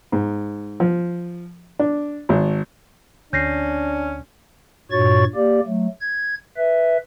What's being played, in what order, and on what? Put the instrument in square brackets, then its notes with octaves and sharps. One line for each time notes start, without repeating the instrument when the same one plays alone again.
[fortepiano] G#2
F3
D4
G#1
[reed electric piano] D2 [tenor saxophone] C#4 [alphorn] D4 [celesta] G6 A#6 C7
[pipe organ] G2 A#2 F#4 C#5 C#6 A6
A#3 G4 D5
F#3 A3
G#6
B4 E5